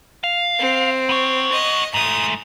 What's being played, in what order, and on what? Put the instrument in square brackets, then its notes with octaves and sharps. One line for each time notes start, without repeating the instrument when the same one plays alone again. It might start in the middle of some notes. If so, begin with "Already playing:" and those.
[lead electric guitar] F5
[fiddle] C4
[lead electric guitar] B3 C#5
[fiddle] D#5
[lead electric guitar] G#2 A3 [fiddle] D#6